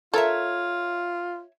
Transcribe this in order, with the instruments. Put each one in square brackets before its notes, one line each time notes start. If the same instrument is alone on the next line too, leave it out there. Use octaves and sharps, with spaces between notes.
[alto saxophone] F4 [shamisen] A4 A#4 [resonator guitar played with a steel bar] C#5 E5